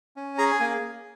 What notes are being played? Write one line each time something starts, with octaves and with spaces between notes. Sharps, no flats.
C#4
G#4 A#5
A#3 G#5